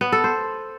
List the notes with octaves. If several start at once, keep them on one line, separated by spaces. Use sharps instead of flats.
B3
A4
C5